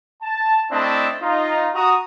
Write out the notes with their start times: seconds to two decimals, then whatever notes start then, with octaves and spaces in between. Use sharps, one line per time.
0.23 A5
0.72 A3 C4 D4 E4 D#5 A5
1.22 D#4 F4 A#5
1.75 F#4 A#5 D#6